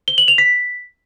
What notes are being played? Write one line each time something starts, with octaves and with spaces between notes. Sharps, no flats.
G7
F#7
F7
B6